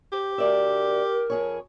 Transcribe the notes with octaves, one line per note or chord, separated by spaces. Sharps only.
G4 C5
D2 A#4 D5 E5
F2 G#4 C#5